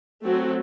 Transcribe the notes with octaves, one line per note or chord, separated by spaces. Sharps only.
F#3 A3 C4 F#4